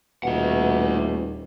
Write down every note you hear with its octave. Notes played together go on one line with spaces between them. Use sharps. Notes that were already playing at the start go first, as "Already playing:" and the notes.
D#1 B2 A3 F#5